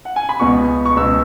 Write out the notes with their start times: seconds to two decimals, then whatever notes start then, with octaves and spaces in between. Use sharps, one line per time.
0.05 F#5
0.16 G#5
0.29 B5
0.39 C#2 B2 B3 C#6
0.85 C#6
0.96 C#2 B2 B3 E6